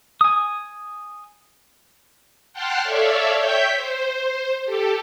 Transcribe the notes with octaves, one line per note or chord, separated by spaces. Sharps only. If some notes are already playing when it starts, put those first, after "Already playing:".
G#5 D#6
F#5 G5 A5 C6 F6 F#6
A4 C#5 D5 E5 F5
C#5 E5 G5 G6 B6
C5
G4 A4